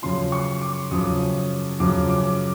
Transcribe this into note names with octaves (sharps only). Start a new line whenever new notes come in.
F#2 C#3 F3 C6
C#6
D6
F#2 C#3 F3 D#6
F#2 C#3 F3 D6
D6